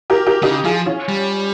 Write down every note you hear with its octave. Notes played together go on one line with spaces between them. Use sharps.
G4 A#4
G4 A#4
C#3 D#4 G4
F3 F4 G#4
C#4 F4
G3